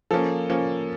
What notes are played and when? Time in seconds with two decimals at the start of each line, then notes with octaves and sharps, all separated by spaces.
0.11 F3 A#3 C#4 A4
0.49 F3 A#3 C#4